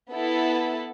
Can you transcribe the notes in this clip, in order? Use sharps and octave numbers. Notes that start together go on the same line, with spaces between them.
B3 E4 A4